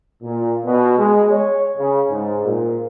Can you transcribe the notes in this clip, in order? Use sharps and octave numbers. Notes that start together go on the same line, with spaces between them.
A#2
B2
G#3
C#5
C#3
G#2
A#2